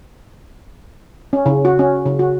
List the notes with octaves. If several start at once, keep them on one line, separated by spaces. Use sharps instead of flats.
C#4
C#3
F#4
C#4
C#3
F#4